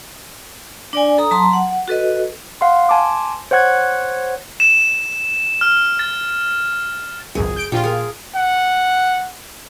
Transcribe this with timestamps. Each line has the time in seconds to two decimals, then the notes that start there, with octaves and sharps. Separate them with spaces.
0.93 D4 D5 G#5
1.18 A4 A#5 D#6
1.31 F#3 A5 A#5 C6
1.53 F#5
1.88 F#4 A4 B4 D#5
2.61 F5 F#5 C6
2.89 G#5 A5 C6 D6
3.51 C5 C#5 F#5 F#6 G#6
4.60 E7
5.61 F6
5.99 A6
7.35 G#1 C#2 F#2 G#4
7.56 G6 D7
7.72 A#1 F4 G4
7.84 G#4 A#4
8.36 F#5